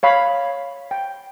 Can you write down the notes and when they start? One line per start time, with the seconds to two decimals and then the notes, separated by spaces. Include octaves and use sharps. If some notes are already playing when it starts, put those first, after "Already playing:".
0.03 C#5 F5 B5
0.91 G5